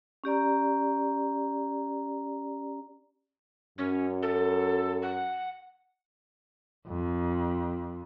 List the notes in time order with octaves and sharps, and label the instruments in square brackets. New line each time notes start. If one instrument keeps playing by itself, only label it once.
[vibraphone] C#4 G4 D5 A#5
[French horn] F#2 [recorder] C#4
[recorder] A4
F#5
[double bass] F2